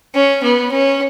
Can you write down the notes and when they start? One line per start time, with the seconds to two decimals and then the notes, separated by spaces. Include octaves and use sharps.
0.14 C#4
0.43 B3
0.71 C#4